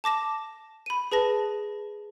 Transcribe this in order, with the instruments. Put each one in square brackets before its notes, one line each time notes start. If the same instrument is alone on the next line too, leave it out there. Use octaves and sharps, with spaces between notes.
[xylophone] A5 D6 A#6 E7
B5 D#7
G#4 B4 A5 A#6